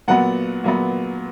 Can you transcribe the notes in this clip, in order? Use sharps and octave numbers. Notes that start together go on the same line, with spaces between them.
A#2 F#3 B3 F#5
A#2 F#3 B3